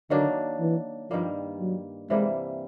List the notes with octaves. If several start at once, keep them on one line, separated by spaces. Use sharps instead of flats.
D3 D#3 F#3 A#3 D4
E3
G2 D#3 F3 G3 A#3
F#3
C3 E3 G3 G#3 A#3